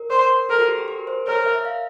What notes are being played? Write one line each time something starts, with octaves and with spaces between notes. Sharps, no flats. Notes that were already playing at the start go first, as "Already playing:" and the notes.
Already playing: A#4
C5
A4 A#4
F#4
G4
G#4
A#4
C5
A#4 C#5
E5
E5
F5